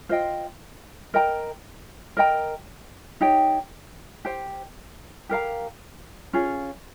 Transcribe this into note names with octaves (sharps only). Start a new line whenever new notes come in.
F4 C5 D#5 G5
A#4 D#5 G5 A#5
A#4 D#5 G5 A#5
D#4 G4 C#5 G5
G4 C5 G5
G4 A#4 F5 A#5
C#4 F4 G#4